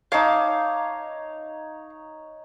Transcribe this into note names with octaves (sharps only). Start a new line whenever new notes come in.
D#4 C#5 F5 A5 D6